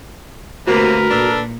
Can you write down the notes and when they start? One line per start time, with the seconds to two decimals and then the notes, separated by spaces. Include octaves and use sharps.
0.67 D2 C3 A#3 F#4 A#4 B4
1.10 A#2 D4 A4 B4